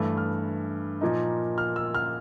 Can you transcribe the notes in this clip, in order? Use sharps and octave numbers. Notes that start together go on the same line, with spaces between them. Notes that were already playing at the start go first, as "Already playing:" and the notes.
Already playing: G2 E3 A3
F6
A#2 F3 A#3 D#4
F6
E6
F6